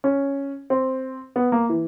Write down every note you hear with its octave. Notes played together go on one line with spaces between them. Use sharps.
C#4
C4
B3
A#3
E3